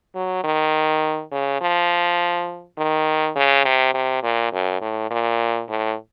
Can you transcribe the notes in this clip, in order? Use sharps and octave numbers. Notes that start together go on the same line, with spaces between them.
F#3
D#3
C#3
F3
D#3
C#3
C3
C3
A#2
F#2
A2
A#2
A2